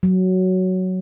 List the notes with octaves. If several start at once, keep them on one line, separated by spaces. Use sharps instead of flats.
F#3